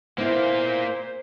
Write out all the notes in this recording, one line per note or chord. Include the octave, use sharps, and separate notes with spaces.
A#3 B3 E4 F4 C5